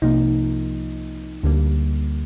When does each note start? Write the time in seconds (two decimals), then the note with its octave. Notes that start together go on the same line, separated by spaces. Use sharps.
0.02 C2 C3 F3 A#3 D#4
1.43 D2 D3 G3 A#3